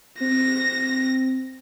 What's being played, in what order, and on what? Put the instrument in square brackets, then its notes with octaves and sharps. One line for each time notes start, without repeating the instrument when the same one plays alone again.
[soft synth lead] C4 [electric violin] A#6